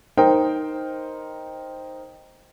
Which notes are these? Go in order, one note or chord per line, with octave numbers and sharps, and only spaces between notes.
D#4 A#4 C5 G5